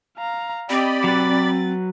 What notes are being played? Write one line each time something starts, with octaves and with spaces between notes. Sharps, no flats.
F5 A#5
C4 G4 D5 D#5 B5
F#3 B4 A6